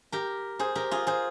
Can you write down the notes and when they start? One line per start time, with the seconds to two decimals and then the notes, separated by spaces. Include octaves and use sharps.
0.12 G4 A#4
0.59 G#4 C5
0.75 G4 A#4
0.91 F4 G#4
1.07 G#4 C5